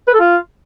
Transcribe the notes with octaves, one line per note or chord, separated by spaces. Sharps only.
B4
A4
F4